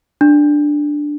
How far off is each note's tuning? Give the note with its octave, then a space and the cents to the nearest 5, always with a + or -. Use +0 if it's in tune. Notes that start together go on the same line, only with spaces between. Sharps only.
D4 +5